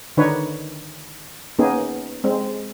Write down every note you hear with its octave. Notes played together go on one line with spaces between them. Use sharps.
D3 D#3 D4 D#4 B4 C#5
A#3 B3 C#4 D#4 G#4
G#3 C4